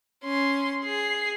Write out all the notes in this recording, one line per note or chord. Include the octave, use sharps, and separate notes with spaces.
C#4 C6
G#4 C7